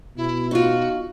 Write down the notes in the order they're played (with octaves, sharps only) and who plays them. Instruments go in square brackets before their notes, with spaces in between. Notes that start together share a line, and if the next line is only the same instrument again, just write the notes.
[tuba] B2 [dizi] E4
[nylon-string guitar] D#4 F4 [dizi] F#4